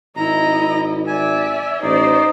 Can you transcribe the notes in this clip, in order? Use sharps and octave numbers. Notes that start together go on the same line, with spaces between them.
G#1 E4 D#5 A#5
D5 E5 G#5
A1 D#4 C5 D5